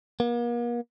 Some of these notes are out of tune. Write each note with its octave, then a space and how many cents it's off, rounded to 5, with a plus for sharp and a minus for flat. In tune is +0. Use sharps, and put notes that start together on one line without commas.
A#3 +40